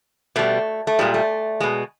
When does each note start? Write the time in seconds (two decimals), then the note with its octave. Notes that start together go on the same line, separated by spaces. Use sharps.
0.36 B2 G3 A3
0.87 A3
0.99 A#2 G3 G#3
1.14 A3
1.60 B2 G#3